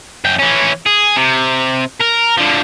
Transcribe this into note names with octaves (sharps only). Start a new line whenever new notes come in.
F#2 G5
E3 C#4
G#4
C3
A#4
D3 F3